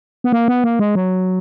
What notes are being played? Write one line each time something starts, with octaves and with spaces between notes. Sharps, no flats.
B3
A#3
B3
A#3
G#3
F#3